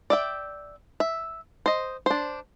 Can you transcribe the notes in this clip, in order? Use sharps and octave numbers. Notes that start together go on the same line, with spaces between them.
D5 E5 G5
E5
C5 D#5
D4 C5